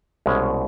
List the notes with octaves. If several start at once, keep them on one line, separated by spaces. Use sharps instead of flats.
C2 B2 G#3 C#4